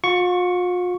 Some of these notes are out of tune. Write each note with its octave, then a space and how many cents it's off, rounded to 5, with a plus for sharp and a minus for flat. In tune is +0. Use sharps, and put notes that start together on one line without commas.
F4 +45 C#6 +5